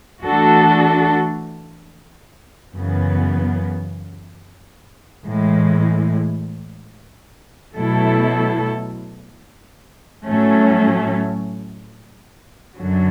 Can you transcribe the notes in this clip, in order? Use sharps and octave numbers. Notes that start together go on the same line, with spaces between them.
E3 A3 D4 F#4 A4
F#2 C#3 E3 B3
A2 E3 G#3
B2 F#3 A3 E4 A4
A2 F#3 A3 C#4
F#2 D3 F#3